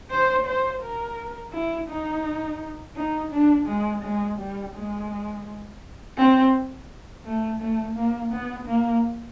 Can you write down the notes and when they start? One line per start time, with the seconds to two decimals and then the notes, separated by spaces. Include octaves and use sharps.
0.11 C5
0.46 C5
0.81 A#4
1.53 E4
1.89 D#4
2.96 D#4
3.32 D4
3.67 G#3
4.03 G#3
4.38 G3
4.74 G#3
6.17 C4
7.25 A3
7.60 A3
7.95 A#3
8.32 B3
8.67 A#3